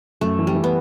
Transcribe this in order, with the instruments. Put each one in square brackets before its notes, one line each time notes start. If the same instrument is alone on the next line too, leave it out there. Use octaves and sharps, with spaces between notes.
[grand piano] F#2 [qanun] A3
[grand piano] E3
[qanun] G3
[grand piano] E3
[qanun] B3